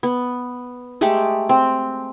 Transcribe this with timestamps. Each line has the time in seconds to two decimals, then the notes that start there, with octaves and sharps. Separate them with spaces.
0.03 B3
1.01 G#3 A3 G4
1.49 C4